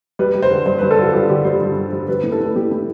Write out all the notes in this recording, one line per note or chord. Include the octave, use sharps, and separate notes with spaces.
G3 B4
G3
C5
D3
G2 C5
G2 B4
A4
D3 F4
G2 G4
D3 G4
G3 C5
G2
D3
G3
G3 B4
A2
A4
A2
A2 G4
A2 E4